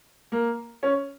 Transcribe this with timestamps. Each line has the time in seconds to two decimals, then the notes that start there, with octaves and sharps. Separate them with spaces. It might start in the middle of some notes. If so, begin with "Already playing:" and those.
0.32 A#3
0.83 C#4